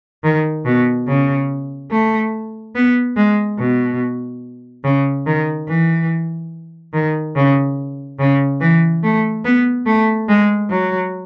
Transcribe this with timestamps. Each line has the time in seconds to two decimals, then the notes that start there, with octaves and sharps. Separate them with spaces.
0.23 D#3
0.65 B2
1.07 C#3
1.91 A3
2.75 B3
3.16 G#3
3.59 B2
4.84 C#3
5.26 D#3
5.68 E3
6.93 D#3
7.36 C#3
8.19 C#3
8.61 E3
9.03 A3
9.45 B3
9.86 A3
10.29 G#3
10.70 F#3